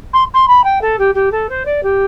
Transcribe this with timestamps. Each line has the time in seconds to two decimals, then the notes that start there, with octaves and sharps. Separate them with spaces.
0.13 C6
0.33 C6
0.47 B5
0.63 G5
0.81 A4
0.98 G4
1.14 G4
1.31 A4
1.49 C5
1.65 D5
1.82 G4